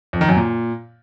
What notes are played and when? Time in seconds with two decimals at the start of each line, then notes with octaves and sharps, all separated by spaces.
0.13 F2
0.21 D#3
0.29 F#2
0.36 A#2